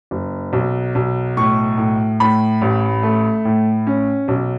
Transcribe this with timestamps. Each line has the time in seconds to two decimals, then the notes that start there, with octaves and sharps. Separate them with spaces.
0.11 F#1
0.53 B1
0.95 B1
1.37 A2 C#6
1.78 A2
2.20 A2 B5
2.61 A1
3.03 A3
3.45 A2
3.87 C#4
4.28 B1